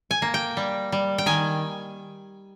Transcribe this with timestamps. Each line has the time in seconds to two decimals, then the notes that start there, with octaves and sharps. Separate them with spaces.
0.11 G#5
0.22 A#3
0.34 G5
0.57 G3
0.92 G3
1.18 G5
1.26 D#3 G#5